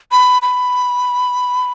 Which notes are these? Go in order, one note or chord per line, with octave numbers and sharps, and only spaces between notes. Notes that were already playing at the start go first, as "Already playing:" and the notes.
B5
B5